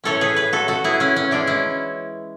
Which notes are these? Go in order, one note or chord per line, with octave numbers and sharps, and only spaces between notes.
A2 E3 A3 C#4 A4 C#5
G#4 B4
G#4 B4
F#4 A4
F#4 A4
E4 G#4
C#4 E4
C#4
E3 G#3 C#4 D4
C#4 E4